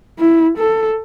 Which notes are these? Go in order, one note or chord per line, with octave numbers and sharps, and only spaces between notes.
E4
A4